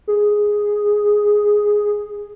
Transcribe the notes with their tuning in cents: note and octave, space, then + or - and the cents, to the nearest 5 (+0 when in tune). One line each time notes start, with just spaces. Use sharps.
G#4 +0